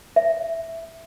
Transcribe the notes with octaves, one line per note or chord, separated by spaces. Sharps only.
E5